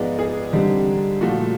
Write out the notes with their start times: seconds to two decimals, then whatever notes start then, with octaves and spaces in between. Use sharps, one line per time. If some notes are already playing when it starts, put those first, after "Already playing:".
Already playing: G#2 F3 G#3 B3 D5
0.19 G#4
0.53 D3 G3 C4 D#4
1.21 A#2 F3 A3 F#4